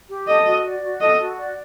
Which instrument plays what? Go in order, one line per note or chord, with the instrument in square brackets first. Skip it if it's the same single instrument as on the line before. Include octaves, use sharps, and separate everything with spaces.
[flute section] G4
[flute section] A4 [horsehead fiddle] D#5
[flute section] F#4
D5
F#4
[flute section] A4 [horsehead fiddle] D#5
[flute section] F#4
D5